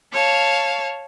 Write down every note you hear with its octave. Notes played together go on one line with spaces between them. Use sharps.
C#5 F5 A5